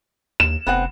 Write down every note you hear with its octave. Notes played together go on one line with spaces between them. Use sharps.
D#2 E7
F1 B3 C4 F#5